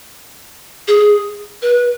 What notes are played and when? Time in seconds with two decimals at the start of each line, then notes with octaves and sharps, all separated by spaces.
0.88 G#4
1.62 B4